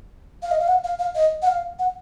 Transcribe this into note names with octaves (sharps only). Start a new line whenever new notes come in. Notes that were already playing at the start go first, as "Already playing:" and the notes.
F5
D#5
F5
F#5
F5
F5
D#5
F#5
F5
F#5